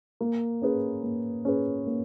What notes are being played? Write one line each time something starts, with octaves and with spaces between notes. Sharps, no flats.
A#3
C#4 G#4 B4
A#3
C#4 G#4 B4
A#3